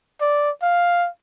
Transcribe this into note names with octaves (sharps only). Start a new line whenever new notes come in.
D5
F5